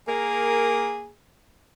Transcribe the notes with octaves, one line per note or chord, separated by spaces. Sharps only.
A#3 G#4 A#4